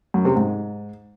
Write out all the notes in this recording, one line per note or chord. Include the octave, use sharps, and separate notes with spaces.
F#2
C3
G#2